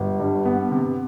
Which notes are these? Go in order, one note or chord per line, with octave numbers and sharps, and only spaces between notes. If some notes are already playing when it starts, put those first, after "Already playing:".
Already playing: G1
G2
B3
C3